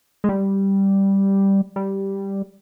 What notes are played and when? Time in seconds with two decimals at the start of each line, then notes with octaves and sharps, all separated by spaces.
0.24 G#3
0.29 G3
1.76 G3